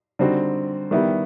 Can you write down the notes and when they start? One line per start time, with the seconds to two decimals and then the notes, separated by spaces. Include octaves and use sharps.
0.19 D3 G3 C4 D#4 F#4
0.91 D#3 G3 B3 E4 G4